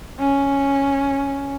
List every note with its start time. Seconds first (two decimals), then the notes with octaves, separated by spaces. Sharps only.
0.19 C#4